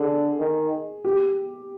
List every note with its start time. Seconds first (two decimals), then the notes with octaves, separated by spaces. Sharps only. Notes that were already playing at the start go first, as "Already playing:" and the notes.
Already playing: D3 G#4
0.39 D#3
1.04 G4